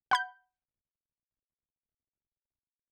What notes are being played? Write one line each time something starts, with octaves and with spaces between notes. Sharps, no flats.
F#5 B5 G6